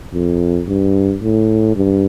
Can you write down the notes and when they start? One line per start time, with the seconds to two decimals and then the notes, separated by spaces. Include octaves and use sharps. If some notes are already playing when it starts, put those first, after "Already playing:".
0.13 F2
0.68 G2
1.22 A2
1.76 G2